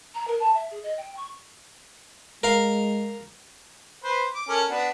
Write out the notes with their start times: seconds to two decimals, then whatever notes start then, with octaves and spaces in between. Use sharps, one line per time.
0.14 A#5
0.27 A#4
0.39 A5
0.54 E5
0.71 G#4
0.82 D#5
0.97 G5
1.16 C#6
2.43 G#3 A#4 F5
4.04 B4 C5
4.35 D6
4.49 C#4 A4 A#4
4.70 B3 D4 F#4